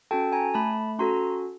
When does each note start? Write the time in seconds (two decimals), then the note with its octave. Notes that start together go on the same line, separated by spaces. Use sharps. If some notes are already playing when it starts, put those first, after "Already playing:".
0.11 C#4 F#4 A4 G5 A5
0.33 G#5 A#5
0.54 A3 A5 B5
0.99 C#4 F#4 A4 A#5 C6